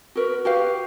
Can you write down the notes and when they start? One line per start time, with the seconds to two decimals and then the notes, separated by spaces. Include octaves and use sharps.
0.15 F#4 A#4 B4
0.45 F#4 G4 B4 F5